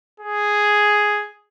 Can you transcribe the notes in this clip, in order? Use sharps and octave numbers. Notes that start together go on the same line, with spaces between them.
G#4